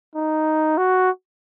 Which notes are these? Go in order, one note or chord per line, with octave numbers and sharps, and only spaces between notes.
D#4
F#4